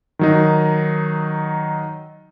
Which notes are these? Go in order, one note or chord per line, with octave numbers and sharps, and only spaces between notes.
D#3 F#3 D#4